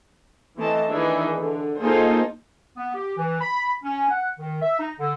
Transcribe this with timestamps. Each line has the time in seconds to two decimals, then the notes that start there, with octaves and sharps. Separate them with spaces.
0.57 E3 A3 C4 D#5 A5
0.90 D#3 E3 D4 D#4 G#4 E5
1.41 D3
1.79 A#3 D#4 F4 G#4 A4 C5
2.77 B3
2.94 G4
3.17 E3
3.40 B5
3.84 C#4
4.09 F#5
4.39 D#3
4.61 E5
4.79 D#4
4.99 D3